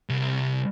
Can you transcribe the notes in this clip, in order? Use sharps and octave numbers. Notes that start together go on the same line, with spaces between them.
C2